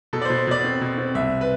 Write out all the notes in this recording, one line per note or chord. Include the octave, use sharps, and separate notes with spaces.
B2 A4
D5
C5
B2
C5
B2 D5
C4
B2
C4
C2 E5
B4